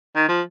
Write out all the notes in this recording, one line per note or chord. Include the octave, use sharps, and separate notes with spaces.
D#3
F3